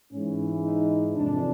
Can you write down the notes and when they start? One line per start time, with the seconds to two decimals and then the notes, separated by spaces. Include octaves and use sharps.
0.13 G#2 E3 C#4
0.64 D#4
1.16 F2 C3 E3 D4